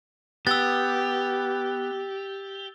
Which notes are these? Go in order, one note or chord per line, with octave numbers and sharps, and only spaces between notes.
B3 G4 E6 A6